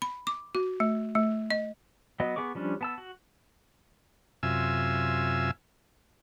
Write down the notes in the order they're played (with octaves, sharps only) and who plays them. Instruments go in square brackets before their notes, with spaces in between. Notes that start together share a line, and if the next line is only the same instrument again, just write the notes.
[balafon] B5
D6
F#4
A3
A3
D#5
[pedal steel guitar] F#3 B3 D#5
B3 G#4 C#6 D6
F3 G3 C#4 D4
B3 A5 E6
F#4
[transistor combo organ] F#2 C3 F4 E5 G#5 E6